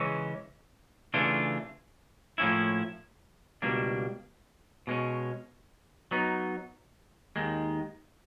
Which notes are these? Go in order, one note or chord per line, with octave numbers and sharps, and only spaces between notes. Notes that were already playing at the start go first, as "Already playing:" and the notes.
Already playing: C#3 E3 G#3 C#4
C#3 E3 A3 D4 F4
A2 F3 A#3 C#4 E4
C#2 B2 G3 A#3 D4
B2 G#3 C#4
F#3 B3 D#4
D#2 D#3 G#3